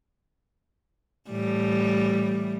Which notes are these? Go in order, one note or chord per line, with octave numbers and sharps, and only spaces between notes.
A2 E3 G3